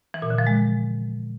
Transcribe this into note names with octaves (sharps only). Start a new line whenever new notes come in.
E3
A#2
D3
F3
G#3